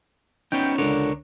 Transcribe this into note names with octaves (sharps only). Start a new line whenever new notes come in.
B3 C#4 D#4 G5 G6
C#2 D3 D4 A#4 C#5